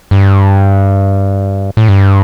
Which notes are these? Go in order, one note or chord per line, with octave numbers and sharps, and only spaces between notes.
G2
A2
G2